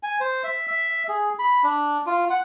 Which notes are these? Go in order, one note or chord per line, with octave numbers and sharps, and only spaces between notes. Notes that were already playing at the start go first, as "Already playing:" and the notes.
G#5
C5
E5
E5
G#4
B5
D4
F4
F#5